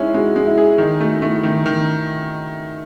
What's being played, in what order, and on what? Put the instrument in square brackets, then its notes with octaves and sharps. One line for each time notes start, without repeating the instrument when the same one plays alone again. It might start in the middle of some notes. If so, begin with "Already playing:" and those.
Already playing: [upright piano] G#3 C#4 [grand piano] D#4 E4
[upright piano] G#3 [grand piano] F#4
[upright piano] G#3
[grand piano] E4
[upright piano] G#4
[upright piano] D#3 [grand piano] D#4
[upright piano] A3 [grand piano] F#4
[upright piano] A3 [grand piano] E4
[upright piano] D#3
D#3